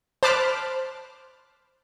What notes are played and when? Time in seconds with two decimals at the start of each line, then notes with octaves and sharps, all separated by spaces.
0.23 C5 A5 B5 D6 F6 F#6